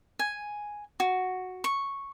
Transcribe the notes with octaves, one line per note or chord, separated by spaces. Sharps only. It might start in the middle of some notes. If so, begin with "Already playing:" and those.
G#5
F#4
C#6